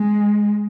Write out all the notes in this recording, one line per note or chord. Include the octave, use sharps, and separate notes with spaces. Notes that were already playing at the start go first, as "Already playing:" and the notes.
Already playing: G#3